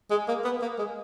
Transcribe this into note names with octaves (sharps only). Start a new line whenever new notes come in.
G#3
A#3
B3
A#3
G#3